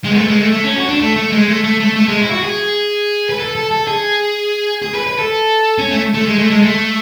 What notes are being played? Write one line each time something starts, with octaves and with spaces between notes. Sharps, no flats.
G#3
B3
A3
G#3
A3
A3
C#4
F#4
D4
A3
A3
G#3
A3
A3
A3
A3
G#3
E4
F#4
G#4
B4
A4
A4
A4
G#4
G#4
B4
B4
A4
C#4
A3
A3
G#3
A3
G#3
A3